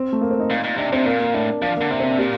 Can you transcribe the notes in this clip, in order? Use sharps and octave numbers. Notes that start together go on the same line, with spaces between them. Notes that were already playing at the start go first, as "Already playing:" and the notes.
Already playing: C4
A3
A#3
C4
D#4
A#2
A#2
C3 D4
C3 C4
A#2 A#3
A#3
A2 D4
F3 D4
D3 A#3
C3 A#3
C4
D4
A#2 G4